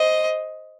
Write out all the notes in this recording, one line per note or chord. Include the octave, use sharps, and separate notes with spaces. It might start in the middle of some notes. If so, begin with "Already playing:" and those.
Already playing: C5 D#5